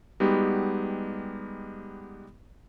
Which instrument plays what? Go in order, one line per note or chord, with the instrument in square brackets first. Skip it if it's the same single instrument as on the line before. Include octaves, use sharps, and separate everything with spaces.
[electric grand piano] G3 G#3 B3 D#4 F#4 G4